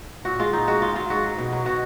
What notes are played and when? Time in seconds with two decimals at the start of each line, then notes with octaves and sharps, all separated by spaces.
0.25 A#2 F#4
0.39 G#3 F4
0.53 A#2 D#4
0.68 G#3 F#4
0.82 G#2 F4
0.96 F#3 F4
1.10 G#2 F#4
1.23 F#3
1.38 B2
1.52 F#3
1.65 B2 F#4